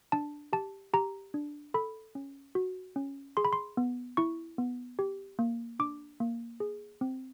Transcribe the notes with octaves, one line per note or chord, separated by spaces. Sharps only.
D4 A5
G4 A5
G4 A#5
D4
A4 B5
C#4
F#4
C#4
G#4 C6
B5
C6
B3
E4 C#6
B3
G4
A#3
D4 D6
A#3
G#4
C4